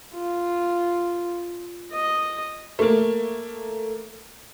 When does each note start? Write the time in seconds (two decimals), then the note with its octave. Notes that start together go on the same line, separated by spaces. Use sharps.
0.14 F4
1.92 D#5
2.79 A3 A#3